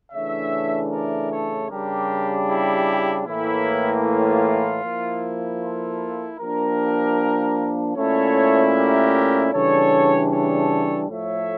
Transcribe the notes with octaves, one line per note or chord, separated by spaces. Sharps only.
C#3 E3 A3 D4 C#5 E5
A#4 D5
A4 C#5
C#3 G3 D4 G4 A#4
E4 G4
A2 E3 A#3 E4
F4
F3 A#3 E4
F4 A4
F3 A#3 D4 G4 A#4
A#2 A3 C#4 E4 A4 C#5
G4 A#4
C#3 E3 G3 D4 A4 C#5
A4 C#5
A2 F3 A3 C#5 E5